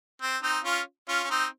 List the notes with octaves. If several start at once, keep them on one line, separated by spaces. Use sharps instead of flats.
C4
C4 D#4
C#4 F4
C#4 F4
C#4
C4 D#4